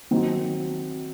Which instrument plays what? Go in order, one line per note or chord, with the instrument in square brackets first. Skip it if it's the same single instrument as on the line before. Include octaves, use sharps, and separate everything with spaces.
[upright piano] D#3 F#3 C4 D#4